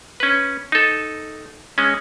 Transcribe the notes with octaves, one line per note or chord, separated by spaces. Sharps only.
C#4 B4
D#4 A4
G#3 C#4